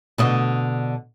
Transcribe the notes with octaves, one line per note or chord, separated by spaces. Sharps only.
B2 D3 D#5